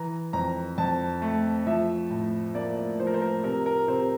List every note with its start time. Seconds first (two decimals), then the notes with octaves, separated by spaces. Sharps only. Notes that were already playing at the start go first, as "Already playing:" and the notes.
Already playing: E3 A#5
0.33 F2 A#5
0.78 F2 A5
1.22 A3
1.67 F3 E5
2.10 A2
2.55 A#3 D5
2.77 D5
2.99 F3 C5
3.07 A#4
3.14 C5
3.22 A#4
3.44 C3 A#4
3.66 A#4
3.88 C3 C5